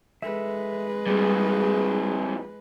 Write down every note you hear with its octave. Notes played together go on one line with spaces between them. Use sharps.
G#3 A4 B4 E5
F2 A#2 G3 G#4